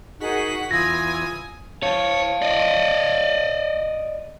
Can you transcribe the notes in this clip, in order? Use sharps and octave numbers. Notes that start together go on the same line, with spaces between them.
D#4 F#4 G#4 A#4 F#5 B6
E2 F4 G#5 D#6 E6 G#6 A#6
C#5 F5 A5
D5 D#5